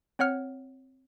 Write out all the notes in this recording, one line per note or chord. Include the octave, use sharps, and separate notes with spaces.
C4 C#5 F#5 F6